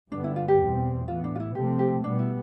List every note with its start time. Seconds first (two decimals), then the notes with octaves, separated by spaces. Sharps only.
0.12 G2 D3 G3 B3 D4
0.24 E4
0.36 F4
0.48 G4
0.60 E2 B2 G3 C4
1.08 A2 E3 B3 F4
1.24 D4
1.35 F4
1.40 E4
1.55 C3 F3 A3 C4 G4
1.79 G4
2.04 B2 G3 B3 D4
2.19 E4